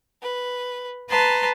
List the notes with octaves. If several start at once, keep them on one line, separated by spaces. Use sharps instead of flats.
B4
B4 A5 A#5 C6